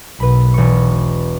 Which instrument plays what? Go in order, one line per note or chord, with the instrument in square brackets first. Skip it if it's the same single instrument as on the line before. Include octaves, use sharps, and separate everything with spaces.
[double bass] B1 [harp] B4 B5
[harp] E1 C#6